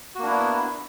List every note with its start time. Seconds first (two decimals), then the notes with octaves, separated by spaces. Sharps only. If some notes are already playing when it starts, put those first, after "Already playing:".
0.15 F#4
0.19 A#3
0.23 D4
0.27 E4
0.31 B3